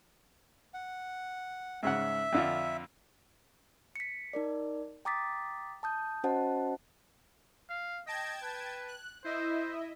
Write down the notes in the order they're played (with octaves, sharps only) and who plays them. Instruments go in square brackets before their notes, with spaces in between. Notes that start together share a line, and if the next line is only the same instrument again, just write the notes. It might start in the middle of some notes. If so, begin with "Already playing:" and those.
[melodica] F#5
[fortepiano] G#2 C#3 F#5 [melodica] E5
[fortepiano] F2 D3 F4
[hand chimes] B6 C#7
D#4 A#4 D5
G5 A#5 D6 D#6 A6 B6
A5 D#6 G6
C#4 F#4 C5 D#5 F#5 A5
[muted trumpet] F5
[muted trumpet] D#5 [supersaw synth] G5 A5 G#6
[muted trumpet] B4
[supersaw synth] F#6
[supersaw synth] E4 D#5 E5 [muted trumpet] C5